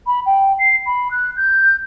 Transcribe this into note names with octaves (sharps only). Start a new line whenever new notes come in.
B5
G5
C7
B5
F#6
G6